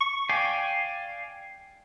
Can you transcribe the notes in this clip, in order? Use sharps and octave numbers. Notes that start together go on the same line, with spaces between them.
C#6
D5 F5 G5 G#5 D6